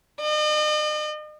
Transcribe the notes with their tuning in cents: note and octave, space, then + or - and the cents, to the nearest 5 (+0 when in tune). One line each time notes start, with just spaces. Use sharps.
D#5 -45